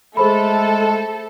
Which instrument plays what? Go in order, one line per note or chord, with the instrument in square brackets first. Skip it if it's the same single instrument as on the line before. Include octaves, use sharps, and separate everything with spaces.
[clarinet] G#3 [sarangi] A3 [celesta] G#4 C5 B5 [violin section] A4